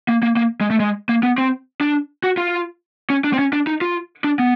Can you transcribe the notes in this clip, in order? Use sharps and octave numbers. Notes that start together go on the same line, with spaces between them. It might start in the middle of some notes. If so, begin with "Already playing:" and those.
A#3
A#3
A#3
G#3
A3
G#3
A#3
B3
C4
D4
F#4
F4
C#4
D4
C4
C#4
D4
D#4
F4
D4
B3